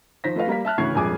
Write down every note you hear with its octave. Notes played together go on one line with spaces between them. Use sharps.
D#3 F3 C5 A#6 B6
A3 F4 B4 F5
G3 A#3 F5 B6
E5 A5 F6 F#6
D2 C#3 E3 C#6 G#6 C7
D#1 A#1 F2 G#3 G#5 D6